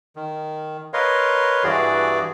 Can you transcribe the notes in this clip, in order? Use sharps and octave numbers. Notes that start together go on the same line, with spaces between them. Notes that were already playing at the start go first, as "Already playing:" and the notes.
D#3
A#4 B4 C#5 D#5 F5 C6
G2 E3 F#4 G#4 D5